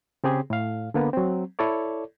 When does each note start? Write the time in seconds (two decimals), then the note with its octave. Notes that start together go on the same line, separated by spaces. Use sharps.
0.24 C#3 C4 G4 G#4
0.50 A2 F5
0.94 D3 A#3 B3
1.13 F#3 C4
1.59 E4 A4 C#5 D5